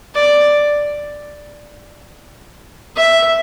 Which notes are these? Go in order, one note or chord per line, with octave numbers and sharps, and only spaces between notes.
D5
E5